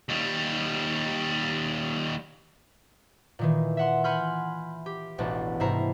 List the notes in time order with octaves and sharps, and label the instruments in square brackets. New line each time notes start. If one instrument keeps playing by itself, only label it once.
[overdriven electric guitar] D#2 G3
[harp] A#2 D#3 E3
E5 F#5 C6
F#5 G#5 B5 C6 F6 G6
G4
E1 A1 B2 D4
G#2 C3 A3 E4 A#5 C7